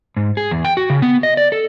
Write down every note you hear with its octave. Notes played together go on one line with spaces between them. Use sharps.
G#2
G#4
E2
G5
F#4
C#3
B3
D#5
D5
A4